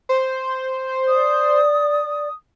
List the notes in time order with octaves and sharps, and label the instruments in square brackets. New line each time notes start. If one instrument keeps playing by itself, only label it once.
[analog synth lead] C5
[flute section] D5 [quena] D#6